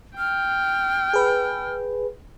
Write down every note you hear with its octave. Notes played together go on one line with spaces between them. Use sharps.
G5 F6
G#4 B4